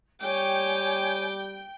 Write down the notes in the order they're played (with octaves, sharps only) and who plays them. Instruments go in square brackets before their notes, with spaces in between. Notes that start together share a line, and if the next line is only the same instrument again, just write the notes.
[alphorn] G3 [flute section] C#5 G#5 [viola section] G5 [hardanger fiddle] D6